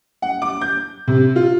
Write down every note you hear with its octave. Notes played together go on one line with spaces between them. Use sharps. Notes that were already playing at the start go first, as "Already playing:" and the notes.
F#5
D6
G6
C3
F4